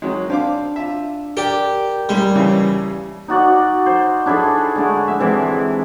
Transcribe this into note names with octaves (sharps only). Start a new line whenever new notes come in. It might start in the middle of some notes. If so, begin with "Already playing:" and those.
D#3 F#3 G#3
C4 D4 F5 D6
F4 E5
G4 A#4 D5 G5
A2 G3 G#3 A#3
D#2 C#3 E3
D#4 F#4 D5 F#5
C5
D4 E4 G#4 A4
D3 G#3 A3
E5
C3 E3 G#3